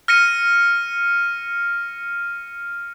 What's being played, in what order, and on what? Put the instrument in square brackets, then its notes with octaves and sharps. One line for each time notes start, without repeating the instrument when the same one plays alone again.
[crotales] F6 A#6 C#7 D#7